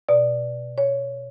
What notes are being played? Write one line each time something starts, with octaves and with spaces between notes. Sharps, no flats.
B2 D5
C#5